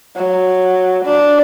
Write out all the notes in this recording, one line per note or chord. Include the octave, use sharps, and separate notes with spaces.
F#3
D4